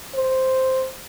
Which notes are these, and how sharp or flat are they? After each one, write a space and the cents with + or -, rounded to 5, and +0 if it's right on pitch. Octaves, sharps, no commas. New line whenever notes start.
C5 +0